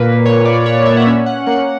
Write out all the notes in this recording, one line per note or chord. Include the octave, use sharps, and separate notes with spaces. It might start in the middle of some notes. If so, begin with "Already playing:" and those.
Already playing: A#2 A#3 B4
A#2 C#5
D5
A#2 C#5
E5
F#5
C#4 E5
F#5
A#3 F#5